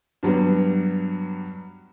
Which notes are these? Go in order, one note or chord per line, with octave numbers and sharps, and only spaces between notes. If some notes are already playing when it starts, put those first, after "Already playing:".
G2 F#3 G3 B3